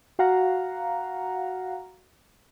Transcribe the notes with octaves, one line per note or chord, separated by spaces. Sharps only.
F#4 F5 F#5 A#5